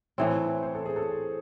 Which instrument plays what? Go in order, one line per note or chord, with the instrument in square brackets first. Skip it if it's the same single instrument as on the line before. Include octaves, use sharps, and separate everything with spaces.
[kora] A2 E3 C4 [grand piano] C#5
[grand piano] C5
A4
G#4
A4